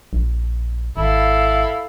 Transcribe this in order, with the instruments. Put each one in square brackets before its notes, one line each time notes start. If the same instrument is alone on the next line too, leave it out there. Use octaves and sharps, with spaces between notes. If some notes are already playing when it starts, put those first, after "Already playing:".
[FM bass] A#1
[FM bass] G#1 [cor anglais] E4 [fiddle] A4 F5